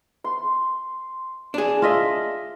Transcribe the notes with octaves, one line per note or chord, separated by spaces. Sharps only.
C6
D4 G#4
F4 D#5 E5